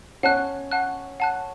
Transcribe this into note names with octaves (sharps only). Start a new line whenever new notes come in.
C#4 F#5 A5 F#6
F#5 A5 F#6
F#5 A5 F#6